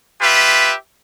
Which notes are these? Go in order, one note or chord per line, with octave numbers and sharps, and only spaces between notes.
F4 G4 B4 E5